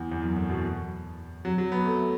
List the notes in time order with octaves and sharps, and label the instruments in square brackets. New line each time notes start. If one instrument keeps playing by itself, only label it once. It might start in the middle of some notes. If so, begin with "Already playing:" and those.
Already playing: [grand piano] E2
E2
F#2
A2
B2
F#3
F#3
B3
A3